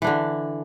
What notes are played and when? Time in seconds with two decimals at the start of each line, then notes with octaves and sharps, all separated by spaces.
0.02 E3
0.04 D4
0.07 D3